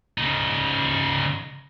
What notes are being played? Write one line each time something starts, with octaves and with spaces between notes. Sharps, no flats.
C#3 D#4